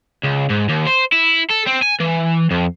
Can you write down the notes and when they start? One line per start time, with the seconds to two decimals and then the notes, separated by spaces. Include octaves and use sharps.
0.23 C#2
0.49 G#2
0.69 D#2
0.87 C5
1.13 E4
1.51 A4
1.67 C4
1.82 G#5
2.00 E3
2.51 F2